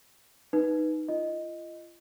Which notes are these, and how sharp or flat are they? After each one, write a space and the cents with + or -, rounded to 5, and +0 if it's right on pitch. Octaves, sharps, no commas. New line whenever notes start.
D#4 +0 B4 -5
F4 -35 D#5 +0